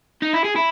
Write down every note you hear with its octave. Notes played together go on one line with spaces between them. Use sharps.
D#4
E4
G#4
E4